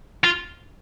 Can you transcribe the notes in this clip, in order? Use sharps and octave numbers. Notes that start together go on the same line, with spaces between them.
F4